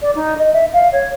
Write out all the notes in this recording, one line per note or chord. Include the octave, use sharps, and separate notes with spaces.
D5
D#4
D#5
E5
F5
C#5